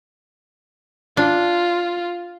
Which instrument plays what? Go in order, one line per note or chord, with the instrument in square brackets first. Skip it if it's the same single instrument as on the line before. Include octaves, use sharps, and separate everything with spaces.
[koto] D4 [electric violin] F4